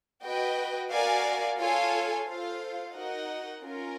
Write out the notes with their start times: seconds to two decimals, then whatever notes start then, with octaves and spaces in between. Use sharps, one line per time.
0.23 F#4 B4 D#5 G5
0.90 F#4 A#4 D5 F5 G#5
1.58 F4 A4 C#5 F5 G#5
2.26 F4 A4 C5 F5
2.94 D#4 F#4 A#4 D#5 F#5
3.62 C#4 F4 A#4